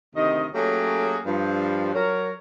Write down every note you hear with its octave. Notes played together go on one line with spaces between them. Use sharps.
D2 C3 D#3 D#5
F#3 A3 A#3 C#4 G4 G#4
G2 F3
F#3 A#4 C#5